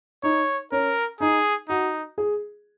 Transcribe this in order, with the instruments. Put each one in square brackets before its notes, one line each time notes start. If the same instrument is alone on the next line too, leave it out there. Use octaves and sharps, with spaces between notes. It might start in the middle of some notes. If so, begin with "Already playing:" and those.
[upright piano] D#4 [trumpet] C#5
[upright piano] C#4 [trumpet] A#4
[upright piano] D#4 [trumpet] G#4
[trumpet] D#4 [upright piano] F#4
[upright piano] G#4